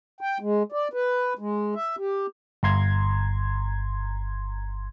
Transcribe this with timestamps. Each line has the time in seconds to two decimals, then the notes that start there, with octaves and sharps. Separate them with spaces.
0.21 G5
0.40 G#3
0.72 D5
0.93 B4
1.39 G#3
1.75 E5
1.98 G4
2.63 G1 A#5 C6 G#6